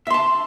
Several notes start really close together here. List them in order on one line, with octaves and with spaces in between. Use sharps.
E5 C6 A5